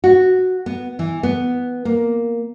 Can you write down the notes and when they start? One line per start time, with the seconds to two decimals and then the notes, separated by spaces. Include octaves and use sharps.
0.04 F#4
0.66 B3
0.99 E3
1.23 B3
1.85 A#3